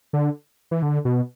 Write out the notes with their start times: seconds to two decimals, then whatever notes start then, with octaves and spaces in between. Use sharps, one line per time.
0.13 D3
0.71 E3
0.82 D3
1.05 B2